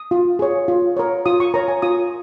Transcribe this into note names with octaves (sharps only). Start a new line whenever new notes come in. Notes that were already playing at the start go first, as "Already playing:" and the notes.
Already playing: D#6
F4
G#4 C#5
F4
A#4 C#5
F4 D#6
C#6
A#4 C#5 A#5
G#5
F4 D#6